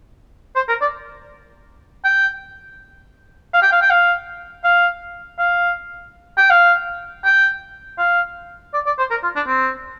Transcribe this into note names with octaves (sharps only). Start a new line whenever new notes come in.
C5
A#4
D5
G5
F5
G5
F5
G5
F5
F5
F5
G5
F5
G5
F5
D5
D5
C5
A#4
F4
D4
C4